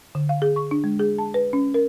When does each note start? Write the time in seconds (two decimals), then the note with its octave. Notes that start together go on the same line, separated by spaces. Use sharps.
0.15 D3
0.29 F5
0.42 G#4
0.56 C#6
0.71 D4
0.84 G#3
0.99 G#4
1.18 A5
1.34 B4
1.53 C#4
1.74 A#4